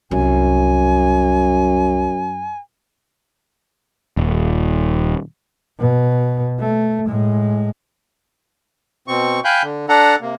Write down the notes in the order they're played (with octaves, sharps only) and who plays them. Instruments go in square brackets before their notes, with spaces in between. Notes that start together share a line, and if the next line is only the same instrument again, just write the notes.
[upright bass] C2 [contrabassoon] F#2 [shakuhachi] G#5
[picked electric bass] D#1
[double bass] B2
A3
A2 G#3
[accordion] B2 C4 C#6
F5 G5 G#5 B5 F#6 G6
D3
D4 A4 F#5 A#5
C3 A#3